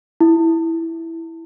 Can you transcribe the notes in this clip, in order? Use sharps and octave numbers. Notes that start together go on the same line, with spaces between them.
E4